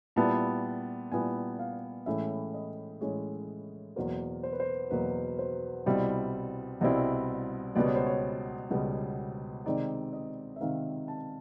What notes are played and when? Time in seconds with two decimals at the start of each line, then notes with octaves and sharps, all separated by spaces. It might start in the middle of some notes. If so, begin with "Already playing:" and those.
0.16 A#2 G3 B3 E4 A5
1.12 A#2 G3 B3 E4 G#5
1.59 F5
2.06 A2 E3 G#3 C#4 E4 E5
2.54 D#5
3.01 A2 E3 G#3 C#4 E4 C#5
3.96 E2 B2 F#3 A#3 C5
4.43 C5
4.53 B4
4.60 C5
4.90 E2 B2 F#3 A#3 B4
5.39 C5
5.86 C2 B2 G3 C4 E4
6.81 C2 B2 G3 C4 E4
7.75 C#2 B2 G3 B3 D5
7.86 C#5
7.95 C5
8.06 C#5
8.70 C#2 B2 G3 B3
9.66 C3 D#3 G#3 C4 D#4 D5
10.13 D#5
10.56 E5
10.61 C3 D#3 G#3 C4 D#4 F5
11.08 A5